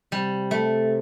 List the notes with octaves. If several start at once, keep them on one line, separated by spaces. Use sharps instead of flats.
C3 G3
A3